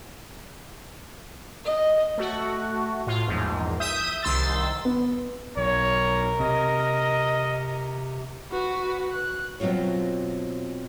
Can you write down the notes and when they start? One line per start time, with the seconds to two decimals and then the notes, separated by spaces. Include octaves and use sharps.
1.66 D#5
2.18 A3 F#4
3.07 A2 F4
3.28 A#1 E2 G#2
3.80 E5 D#6 G6
4.23 C2 D#3 C6 E6 A6
4.85 B3
5.57 B1 A#4 C#5
6.40 C3 D#5
8.51 F#4 B4
9.12 F#6
9.60 B2 F#3 C4 F4 C#5